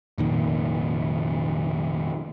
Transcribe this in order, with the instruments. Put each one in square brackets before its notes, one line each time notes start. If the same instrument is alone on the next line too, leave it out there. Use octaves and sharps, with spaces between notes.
[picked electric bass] F1 A#2 D#3